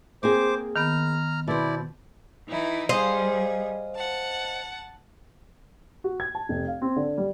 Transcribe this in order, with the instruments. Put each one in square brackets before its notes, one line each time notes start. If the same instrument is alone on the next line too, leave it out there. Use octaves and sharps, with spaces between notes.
[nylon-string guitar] A#3 C4 G#4 [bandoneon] C5 D6
[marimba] D#3 B3 [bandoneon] A#5 F6
[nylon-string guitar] B2 C5 [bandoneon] E4 D5
[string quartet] E3 D#4 E4
[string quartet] G3 G#4 [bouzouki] C5 D#5 F5
[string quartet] F#5 A5
[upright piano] F#4
G#6
A5
F1
F5
C4
D3
G3